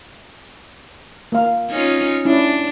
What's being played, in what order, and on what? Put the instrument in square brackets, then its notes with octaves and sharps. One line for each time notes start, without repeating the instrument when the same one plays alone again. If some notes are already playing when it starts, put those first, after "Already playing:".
[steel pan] A#3 F5
[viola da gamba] C#4 D#4 F4
[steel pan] C#4 E4 [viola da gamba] D4